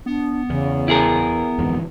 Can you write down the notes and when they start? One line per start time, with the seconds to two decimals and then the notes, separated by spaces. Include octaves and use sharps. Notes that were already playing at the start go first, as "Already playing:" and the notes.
0.06 B3 D4
0.50 E2 C#3
0.88 E4 G#4 A#4
1.59 D1 F2 G#2 E3